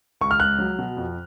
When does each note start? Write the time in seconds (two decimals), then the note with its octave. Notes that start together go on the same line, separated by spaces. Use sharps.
0.21 C#2 C#6
0.31 F6
0.40 C#2 F#6
0.58 F#3
0.78 B2
0.97 F2